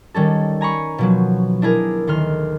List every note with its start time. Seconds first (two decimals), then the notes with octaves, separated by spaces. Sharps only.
0.14 D#3 G3 C#4 A4
0.61 G#5 A#5 B5 C#6
0.98 B2 F3 F#3
1.62 D4 E4 G#4 A#4
2.07 D2 D#3 C6 F6